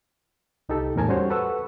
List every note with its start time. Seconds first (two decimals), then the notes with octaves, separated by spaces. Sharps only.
0.69 C2 D#4 G4 A4
0.96 E2 A2 A#4 G#5 A5
1.08 G3 C#4 F#4 C5 C#5
1.30 A4 B4 F#5 C#6 E6